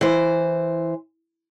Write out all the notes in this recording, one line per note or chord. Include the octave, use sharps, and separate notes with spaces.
E3 C5